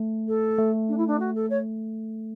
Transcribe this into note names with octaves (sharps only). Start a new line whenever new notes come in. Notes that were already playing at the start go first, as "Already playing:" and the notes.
Already playing: A3
A4
A3
D4
E4
D4
F#4
A4
C#5